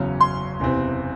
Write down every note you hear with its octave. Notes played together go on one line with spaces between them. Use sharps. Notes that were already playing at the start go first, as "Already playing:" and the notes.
Already playing: F#1 E2 C#3 F#3 C#4
C6
F#1 E2 C3 E3 C4